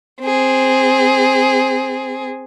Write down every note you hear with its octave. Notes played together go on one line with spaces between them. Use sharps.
C4 G#4